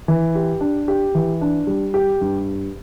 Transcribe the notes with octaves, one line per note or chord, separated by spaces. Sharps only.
E3
G4
D4
G4
E3
D4
G3
G4
G2